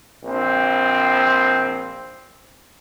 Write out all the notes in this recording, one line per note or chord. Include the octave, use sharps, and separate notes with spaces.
A#1 C4